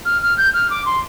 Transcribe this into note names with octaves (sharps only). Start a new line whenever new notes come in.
F6
F6
G6
F6
D6
C6